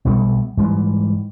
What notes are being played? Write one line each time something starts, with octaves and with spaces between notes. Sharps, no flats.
B1 B2 G3 A3
G#2 E3 G3